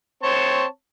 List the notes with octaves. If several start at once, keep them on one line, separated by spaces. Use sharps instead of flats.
C4 C#5 A5